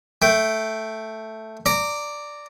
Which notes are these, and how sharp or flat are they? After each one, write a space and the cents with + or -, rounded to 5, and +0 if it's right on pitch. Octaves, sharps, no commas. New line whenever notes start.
A3 +0 G5 -10
D5 +0 A#5 -20